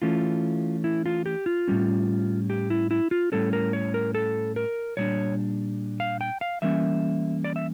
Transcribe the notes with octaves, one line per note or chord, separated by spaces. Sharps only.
E3 A3 C#4 F4
E4
F4
G4
F4
A2 G3 C#4
G4
E4
E4
F4
A2 G3 C#4 A4
A#4
C#5
A#4
A4
A#4
A#2 G3 D4 C#5
F5
G5
F5
E3 G3 A#3 C#4 E5
D5
E5